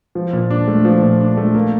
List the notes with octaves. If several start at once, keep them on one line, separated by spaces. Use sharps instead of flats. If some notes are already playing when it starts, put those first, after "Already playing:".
F3
A#2
D4
A3
F3
A#2
D4
A3
A#3